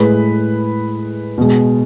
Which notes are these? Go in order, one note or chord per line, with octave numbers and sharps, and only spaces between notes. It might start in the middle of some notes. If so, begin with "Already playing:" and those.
Already playing: A2 G#3 B4
B2 G#3